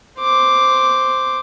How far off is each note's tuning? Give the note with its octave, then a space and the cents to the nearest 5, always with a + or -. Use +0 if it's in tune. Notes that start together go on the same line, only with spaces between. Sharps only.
C5 +0 D6 +0